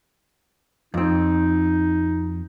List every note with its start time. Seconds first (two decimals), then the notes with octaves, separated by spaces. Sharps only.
0.94 F2 C4 D#4